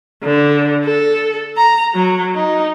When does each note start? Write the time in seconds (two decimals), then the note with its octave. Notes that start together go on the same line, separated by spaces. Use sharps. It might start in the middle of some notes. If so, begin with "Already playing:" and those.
0.23 D3
0.85 A4
1.57 A#5
1.95 F#3
2.35 D#4